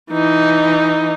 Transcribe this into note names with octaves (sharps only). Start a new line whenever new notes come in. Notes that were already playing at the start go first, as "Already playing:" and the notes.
E3 D#4